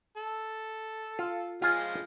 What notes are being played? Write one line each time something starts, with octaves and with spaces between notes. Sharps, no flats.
A4
F4
F3 G#3 F4 G#5 F6